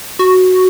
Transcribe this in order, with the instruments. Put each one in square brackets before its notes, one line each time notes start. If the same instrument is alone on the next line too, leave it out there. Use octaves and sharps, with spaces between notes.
[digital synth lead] F#4